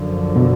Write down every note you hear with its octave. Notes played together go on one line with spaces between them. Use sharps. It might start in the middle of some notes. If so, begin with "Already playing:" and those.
Already playing: F#2 D3 F3
B2